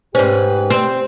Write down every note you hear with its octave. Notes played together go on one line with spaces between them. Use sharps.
G#2 C#4 G4 B4 C5
C4